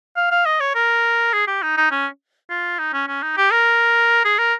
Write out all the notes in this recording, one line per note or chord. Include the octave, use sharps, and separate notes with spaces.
F5
F5
D#5
C#5
A#4
G#4
G4
D#4
D#4
C#4
F4
D#4
C#4
C#4
D#4
G4
A#4
G#4
A#4